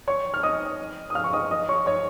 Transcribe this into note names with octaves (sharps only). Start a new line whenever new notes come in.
C#5 C#6
F6
D#5 D#6
D#6
F5 F6
C#6
D#5 D#6
D#5 D#6
C#5 C#6
C#5 C#6